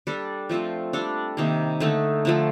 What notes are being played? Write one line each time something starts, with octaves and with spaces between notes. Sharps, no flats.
G3 D4 A4 D5
F3 A3 C4 F4
G3 D4 A4 D5
C3 D#3 A#3
D3 A3 D#4
D3 F3 A3